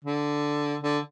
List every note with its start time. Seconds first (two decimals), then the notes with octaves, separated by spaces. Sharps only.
0.04 D3
0.83 D3